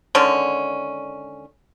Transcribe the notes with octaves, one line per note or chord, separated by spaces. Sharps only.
D3 D#3 G#3 C#4